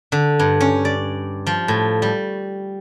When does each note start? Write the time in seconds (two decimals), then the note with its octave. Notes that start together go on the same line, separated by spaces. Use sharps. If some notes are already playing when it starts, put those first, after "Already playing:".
0.12 D3
0.40 G2
0.61 C#4
0.85 D5
1.47 F3
1.68 A2
2.02 G3